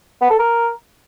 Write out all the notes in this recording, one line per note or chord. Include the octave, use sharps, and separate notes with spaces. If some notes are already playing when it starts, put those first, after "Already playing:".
B3
A4
A#4